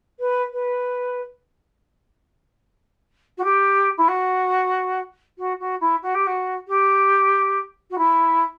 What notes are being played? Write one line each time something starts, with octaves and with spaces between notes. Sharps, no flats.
B4
B4
F#4
G4
E4
F#4
F#4
F#4
E4
F#4
G4
F#4
G4
F#4
E4